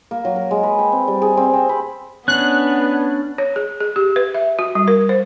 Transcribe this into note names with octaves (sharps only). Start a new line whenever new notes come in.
A#3
F#3
A#4
G#3
B4
G5
C4
G3
G#4
C4
C4
B5
B3 C#4 D4 F#6
C#5
G#4
G#4
G4
B4
E5
F#4
G3
A#4
C5